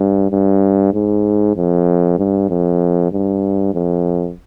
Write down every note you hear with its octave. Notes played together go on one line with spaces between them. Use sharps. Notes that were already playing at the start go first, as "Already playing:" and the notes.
Already playing: G2
G2
G#2
F2
G2
F2
G2
F2